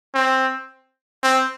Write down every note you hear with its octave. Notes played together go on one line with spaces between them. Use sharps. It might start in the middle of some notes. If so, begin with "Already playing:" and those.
C4
C4